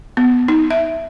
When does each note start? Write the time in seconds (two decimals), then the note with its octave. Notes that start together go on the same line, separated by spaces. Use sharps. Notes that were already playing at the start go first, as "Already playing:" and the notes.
0.17 B3
0.48 D#4
0.71 E5